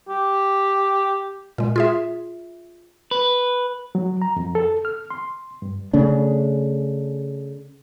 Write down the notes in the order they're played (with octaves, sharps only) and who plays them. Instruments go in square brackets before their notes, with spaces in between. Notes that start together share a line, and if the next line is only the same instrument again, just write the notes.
[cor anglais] G4
[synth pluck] A#2 G#3
F4 G#4 E5
[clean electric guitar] B4
[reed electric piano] F#3
A#5
F2
A4
F6
C6
G2
[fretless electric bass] C#3 A3 D4